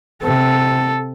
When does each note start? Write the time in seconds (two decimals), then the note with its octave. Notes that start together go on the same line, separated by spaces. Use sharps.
0.23 C3 A4